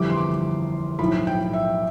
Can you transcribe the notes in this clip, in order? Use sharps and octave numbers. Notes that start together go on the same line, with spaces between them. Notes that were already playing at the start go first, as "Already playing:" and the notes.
Already playing: G1 F2 E3 G3 D6
C6
D6
B1 A2 F3 B5
G5
E5